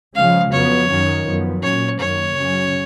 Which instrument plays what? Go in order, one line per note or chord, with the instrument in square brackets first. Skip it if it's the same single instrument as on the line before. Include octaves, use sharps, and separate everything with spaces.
[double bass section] C#3 F3 G#3 C#4 [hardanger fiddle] F5
[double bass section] F2 C#3 F#3 B3 [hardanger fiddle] C#5
[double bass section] F#2 D#3 F#3 C#4
F#2 F3 B3
[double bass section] A#2 F#3 C#4 [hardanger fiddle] C#5
[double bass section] F#2 D#3 A#3 [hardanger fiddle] C#5
[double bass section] F#2 C#3 F#3 C#4